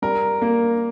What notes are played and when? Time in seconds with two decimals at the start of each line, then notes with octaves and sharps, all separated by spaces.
0.02 G3 A#4
0.42 A#3